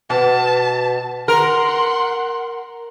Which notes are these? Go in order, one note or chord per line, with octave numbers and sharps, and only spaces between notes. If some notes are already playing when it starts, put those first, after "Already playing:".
B2 A5
A#4 F#5 C6